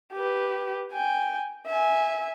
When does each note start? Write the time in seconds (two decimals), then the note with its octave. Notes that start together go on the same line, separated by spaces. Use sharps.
0.13 G4 B4
0.92 G5 G#5
1.67 E5 G#5